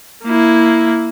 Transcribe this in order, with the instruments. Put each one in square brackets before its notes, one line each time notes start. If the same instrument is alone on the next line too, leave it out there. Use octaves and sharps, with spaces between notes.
[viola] A#3 E4